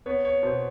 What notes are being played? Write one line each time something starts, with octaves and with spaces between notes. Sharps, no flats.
B3 C#5
C#5
B2 C5